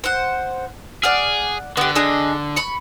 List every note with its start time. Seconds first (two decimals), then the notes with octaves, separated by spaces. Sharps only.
0.04 C5 F#5
1.03 G#4 D5 F#5 F6
1.77 D3 B3 G4
1.95 D4 G#4 D#5
2.56 B5 C#6